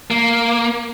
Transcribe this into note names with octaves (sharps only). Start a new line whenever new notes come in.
A#3